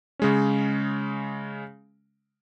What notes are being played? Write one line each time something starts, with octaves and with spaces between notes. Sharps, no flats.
C#3 G#3 C#4